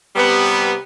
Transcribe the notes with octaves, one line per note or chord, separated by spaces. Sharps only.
C3 G3 B3